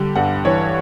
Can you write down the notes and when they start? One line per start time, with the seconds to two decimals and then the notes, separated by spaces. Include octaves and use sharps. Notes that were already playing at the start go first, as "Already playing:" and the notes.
Already playing: D3 G3
0.15 G2 F#5
0.45 E3 C#5